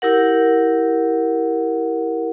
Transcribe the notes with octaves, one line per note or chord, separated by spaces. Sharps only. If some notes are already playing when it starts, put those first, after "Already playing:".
E4 G4 A#4 F#5